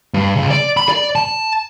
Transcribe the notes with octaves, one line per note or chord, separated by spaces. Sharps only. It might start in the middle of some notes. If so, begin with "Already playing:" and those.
G2
C#2
D5
B5
D5
A5